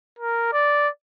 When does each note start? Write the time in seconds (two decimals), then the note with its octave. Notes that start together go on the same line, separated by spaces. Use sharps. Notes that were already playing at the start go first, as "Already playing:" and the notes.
0.19 A#4
0.53 D5